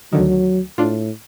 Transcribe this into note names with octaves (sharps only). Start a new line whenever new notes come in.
D2 D3 D#3 F#3
A2 D4 F4